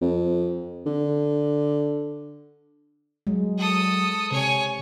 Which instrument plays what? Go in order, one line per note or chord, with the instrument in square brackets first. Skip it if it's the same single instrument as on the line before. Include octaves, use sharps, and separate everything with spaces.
[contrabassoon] F2
D3
[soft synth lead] F#3 [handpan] G#3
[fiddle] A4 D#6
[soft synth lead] C3 [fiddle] C#5 G#5